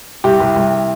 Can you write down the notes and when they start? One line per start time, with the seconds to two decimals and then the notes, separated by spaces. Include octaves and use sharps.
0.24 C2 G4
0.40 C2
0.56 C2